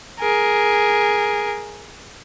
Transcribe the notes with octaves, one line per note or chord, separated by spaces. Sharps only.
G#4 A#4